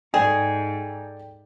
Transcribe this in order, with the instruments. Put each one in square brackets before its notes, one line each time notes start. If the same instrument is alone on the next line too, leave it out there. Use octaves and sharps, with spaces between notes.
[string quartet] G#2 [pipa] G#4 [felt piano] A4 D5 G5